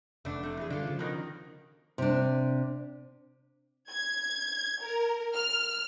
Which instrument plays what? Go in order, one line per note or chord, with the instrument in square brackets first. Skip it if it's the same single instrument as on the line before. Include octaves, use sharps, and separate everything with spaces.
[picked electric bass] F1 [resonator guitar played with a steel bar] A3 B3 D4
[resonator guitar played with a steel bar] C3 A3
E3 G#4
[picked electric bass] G2 D3 [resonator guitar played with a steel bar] D4 F4 A4
[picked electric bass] C#3 F3
[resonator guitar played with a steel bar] B2 D#3 A#4
[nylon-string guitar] C3 D4
[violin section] G#6
A#4
F6